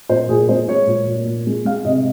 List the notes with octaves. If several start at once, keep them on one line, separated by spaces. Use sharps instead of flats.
A#2 C5
A#2 G#4
G#3 C5
G#3 C#5
A#2
A#2
A#2
G#3
G#3 F5
C3 D#5